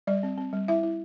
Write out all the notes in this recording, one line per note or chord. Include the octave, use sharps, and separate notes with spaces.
G3 D5
C4
C4
G3
E4 E5
E4